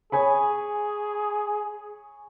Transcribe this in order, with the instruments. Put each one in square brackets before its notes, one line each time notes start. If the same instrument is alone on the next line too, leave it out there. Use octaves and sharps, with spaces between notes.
[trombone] G#4 [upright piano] C#5 G#5 B5